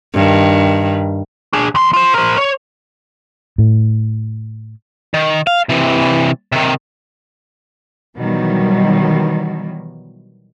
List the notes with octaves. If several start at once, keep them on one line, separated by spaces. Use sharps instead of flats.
G2 D#3
D4 G#4
E2 C6
F4 C5
A#4 C5
C#5
A2
D#3
F5
C3 E3
C3 D#3
B2 D#3 E3 F#3 G3